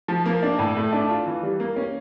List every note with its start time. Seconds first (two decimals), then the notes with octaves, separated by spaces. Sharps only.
0.08 F3
0.26 A#3
0.43 D4
0.59 A2
0.76 A3
0.93 D4
1.10 F4
1.26 E3
1.43 G3
1.60 A#3
1.76 C#4